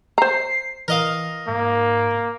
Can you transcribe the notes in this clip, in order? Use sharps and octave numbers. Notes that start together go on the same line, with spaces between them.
C5 A#5 C7
E3 A#4 D#5 F5
G#2 A#3